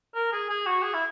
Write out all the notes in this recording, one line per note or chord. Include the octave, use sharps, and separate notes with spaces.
A#4
G#4
G#4
F#4
G#4
E4